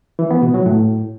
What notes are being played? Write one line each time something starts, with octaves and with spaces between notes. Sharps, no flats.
E3
B3
B2
F#3
A2